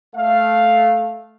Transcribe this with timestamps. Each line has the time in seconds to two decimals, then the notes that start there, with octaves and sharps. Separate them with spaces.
0.14 A3 F5